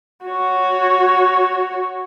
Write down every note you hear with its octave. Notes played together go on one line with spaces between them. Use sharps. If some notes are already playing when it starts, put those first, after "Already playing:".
F#4 C#5